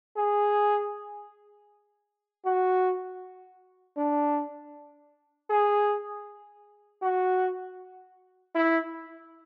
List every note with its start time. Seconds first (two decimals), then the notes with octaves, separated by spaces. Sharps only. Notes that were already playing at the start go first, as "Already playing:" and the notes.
0.16 G#4
2.45 F#4
3.97 D4
5.50 G#4
7.02 F#4
8.55 E4